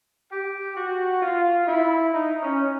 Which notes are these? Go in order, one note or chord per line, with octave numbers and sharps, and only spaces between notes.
G4
F#4
F4
E4
D#4
C#4